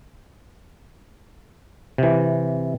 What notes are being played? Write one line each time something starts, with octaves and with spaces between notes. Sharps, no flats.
C3 E3